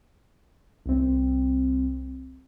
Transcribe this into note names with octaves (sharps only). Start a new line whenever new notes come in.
C2 C4